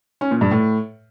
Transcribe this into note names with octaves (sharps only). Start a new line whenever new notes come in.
C#4
A#2
G2
A2